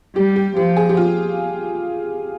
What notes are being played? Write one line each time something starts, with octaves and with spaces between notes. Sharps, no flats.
G3 G4
G4
F3 G4
G#4
G4
F4